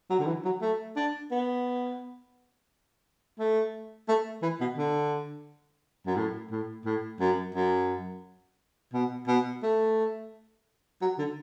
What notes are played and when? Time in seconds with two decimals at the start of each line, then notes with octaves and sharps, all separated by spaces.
0.10 F#3
0.19 D3
0.27 E3
0.44 F#3
0.61 A3
0.96 D4
1.31 B3
3.39 A3
4.09 A3
4.42 E3
4.60 B2
4.78 D3
6.06 F#2
6.16 A2
6.51 A2
6.85 A2
7.20 F#2
7.54 F#2
8.93 B2
9.28 B2
9.63 A3
11.01 F#3
11.18 D3